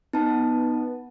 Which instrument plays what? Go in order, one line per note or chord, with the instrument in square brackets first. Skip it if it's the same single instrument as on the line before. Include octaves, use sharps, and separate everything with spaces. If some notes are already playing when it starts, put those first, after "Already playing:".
[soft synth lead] B3 [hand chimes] D#4 A5